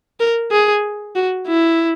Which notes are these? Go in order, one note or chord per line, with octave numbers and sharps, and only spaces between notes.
A#4
G#4
F#4
E4